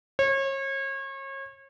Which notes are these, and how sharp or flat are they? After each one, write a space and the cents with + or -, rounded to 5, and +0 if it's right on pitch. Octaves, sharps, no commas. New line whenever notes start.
C#5 -35